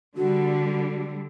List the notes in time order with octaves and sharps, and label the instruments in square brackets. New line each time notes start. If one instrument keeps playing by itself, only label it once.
[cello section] D3 G3 [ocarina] F#4